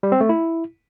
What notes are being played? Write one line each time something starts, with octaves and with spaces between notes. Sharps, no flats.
G3
C4
A3
E4